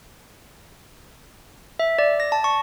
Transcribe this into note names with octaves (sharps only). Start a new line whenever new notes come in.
E5
D5
A#6
A5
C#6